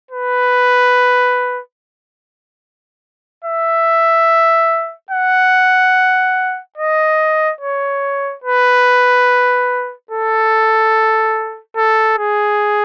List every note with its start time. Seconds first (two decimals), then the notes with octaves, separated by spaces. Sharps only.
0.11 B4
3.45 E5
5.11 F#5
6.78 D#5
7.61 C#5
8.44 B4
10.11 A4
11.77 A4
12.19 G#4